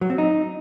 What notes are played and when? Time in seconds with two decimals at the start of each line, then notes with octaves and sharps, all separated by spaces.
0.01 F#3
0.10 C4
0.18 D#4